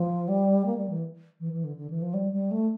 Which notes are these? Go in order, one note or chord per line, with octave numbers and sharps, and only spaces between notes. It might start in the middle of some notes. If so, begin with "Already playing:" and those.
Already playing: F3
G3
A#3
G3
E3
E3
E3
D3
D3
E3
F3
G3
G3
A3